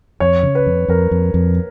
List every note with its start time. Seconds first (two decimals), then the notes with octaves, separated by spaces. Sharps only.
0.20 F2 C#5
0.43 C#3
0.55 B4
0.66 F2
0.88 F2 A#4
1.11 F2
1.34 F2